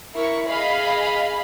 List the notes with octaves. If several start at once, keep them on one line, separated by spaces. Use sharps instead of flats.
E4 A#4 C#6
G#4 D#5 F5 B5